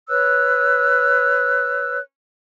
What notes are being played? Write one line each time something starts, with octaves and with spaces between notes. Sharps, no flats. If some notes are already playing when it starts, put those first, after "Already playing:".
B4 C#5 E6 F#6